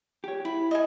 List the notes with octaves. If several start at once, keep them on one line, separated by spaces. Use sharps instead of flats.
G4 C#5
E4 B5
D#5 E5 G#5